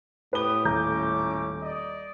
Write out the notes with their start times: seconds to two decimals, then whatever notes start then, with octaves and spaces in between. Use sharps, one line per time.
0.33 A2 B3 G4 B4 D#6 G7
0.65 D#1 A3 C#4 A#5 D6 G6
1.61 D5 D#5